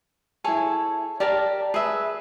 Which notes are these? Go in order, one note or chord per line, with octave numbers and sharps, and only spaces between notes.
E4 G#4 A4 C#5 G#5
G4 A#4 D5 A5
G#4 B4 E5